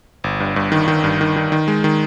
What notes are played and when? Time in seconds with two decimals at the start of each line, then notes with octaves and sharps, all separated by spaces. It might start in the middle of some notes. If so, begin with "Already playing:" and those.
0.24 G1
0.40 G2
0.56 G2
0.72 D#3
0.88 D#3
1.04 G2
1.21 D#3
1.36 D#3
1.52 D#3
1.68 G#3
1.84 D#3